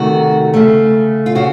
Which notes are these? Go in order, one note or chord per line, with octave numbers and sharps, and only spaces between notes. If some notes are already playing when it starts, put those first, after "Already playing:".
Already playing: C3 D#3 A3 F#4
C#3 A3
F4
C#3 F#4